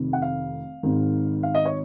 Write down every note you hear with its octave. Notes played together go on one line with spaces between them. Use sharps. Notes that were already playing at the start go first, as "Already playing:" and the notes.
Already playing: F1 F2 C3 D#3
F#5
F5
G#1 G#2 D#3
F5
D#5
C#5